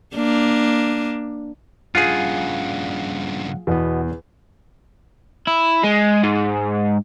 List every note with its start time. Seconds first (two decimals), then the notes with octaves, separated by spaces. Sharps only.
0.15 A#3 D4
1.95 G2 C#3 F4 G#4 F5 F#5
3.67 E2 B2 B3
5.47 E4
5.83 G#3
6.23 G#2